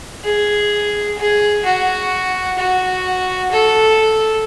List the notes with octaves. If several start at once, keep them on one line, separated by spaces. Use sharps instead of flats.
G#4
G#4
F#4
F#4
A4